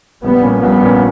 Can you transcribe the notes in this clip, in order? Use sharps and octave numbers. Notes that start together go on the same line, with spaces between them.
A#1 G3 B3
A#2 A#3 C#4
A#1 G3 B3
A#2 A#3 C#4